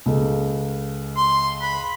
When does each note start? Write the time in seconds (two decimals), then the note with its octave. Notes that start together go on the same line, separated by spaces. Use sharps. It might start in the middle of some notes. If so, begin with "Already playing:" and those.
0.06 C#2 A4
1.16 C6
1.61 B5